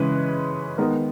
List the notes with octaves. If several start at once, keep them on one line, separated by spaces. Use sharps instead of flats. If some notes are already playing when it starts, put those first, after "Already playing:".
Already playing: C#3 E3 G#3 C#4 B4
D#3 G#3 B3 A#4